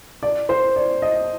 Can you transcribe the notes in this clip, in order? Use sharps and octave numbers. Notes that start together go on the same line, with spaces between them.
D5
C5
D5
D#5